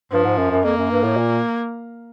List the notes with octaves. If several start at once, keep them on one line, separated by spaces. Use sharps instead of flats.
G2 F3
G#2
F#2
F#2
F2 A#3
F#2
G2
A2
A#2